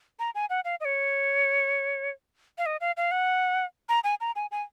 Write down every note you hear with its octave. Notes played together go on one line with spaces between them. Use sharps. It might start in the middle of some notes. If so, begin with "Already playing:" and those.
A#5
G#5
F#5
F5
D#5
C#5
F5
D#5
F5
F5
F#5
A#5
G#5
A#5
G#5
G#5